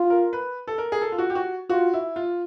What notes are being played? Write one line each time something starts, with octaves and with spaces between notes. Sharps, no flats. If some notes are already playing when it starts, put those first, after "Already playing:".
Already playing: F4
A#4
B4
A4
A#4
G#4
A4
F4
F#4
G4
F#4
F4 F#4
E4
F4